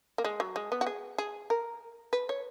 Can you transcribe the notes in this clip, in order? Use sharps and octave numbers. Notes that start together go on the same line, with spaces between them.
A#3
G#3
F#3
G#3
B3
F#4
G#4
G#4
A#4
B4
C#5